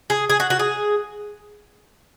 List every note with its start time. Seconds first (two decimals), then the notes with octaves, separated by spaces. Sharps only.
0.10 G#4
0.30 G#4
0.40 F#4
0.50 F#4
0.59 G#4